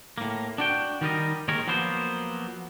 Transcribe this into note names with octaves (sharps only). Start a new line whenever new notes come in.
A2 A#3
D4 F#4 G5
D#3 G3 A#4 D#5
D#2 D#3 G#3 A#4 C#5
F3 F#3 A#3 B3 C5